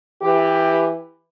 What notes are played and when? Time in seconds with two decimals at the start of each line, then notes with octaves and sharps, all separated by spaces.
0.22 E3 G4